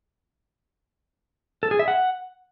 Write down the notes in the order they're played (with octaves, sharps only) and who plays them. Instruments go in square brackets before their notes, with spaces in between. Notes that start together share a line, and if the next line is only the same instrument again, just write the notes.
[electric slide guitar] A4
G#4
E5
F#5